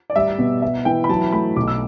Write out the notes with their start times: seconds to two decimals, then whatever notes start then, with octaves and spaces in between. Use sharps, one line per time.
0.10 D5
0.16 G3 E5
0.39 B2
0.62 B3 E5
0.85 E3 G5
1.04 B5
1.09 F#3 A5
1.32 A3 B5
1.56 B1 D6
1.67 E6